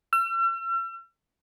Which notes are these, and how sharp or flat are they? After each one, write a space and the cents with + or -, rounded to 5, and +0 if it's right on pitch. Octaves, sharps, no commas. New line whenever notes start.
E6 +45